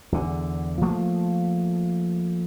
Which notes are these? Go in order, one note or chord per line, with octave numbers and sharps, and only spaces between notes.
E2 D3
F3 A3 A#3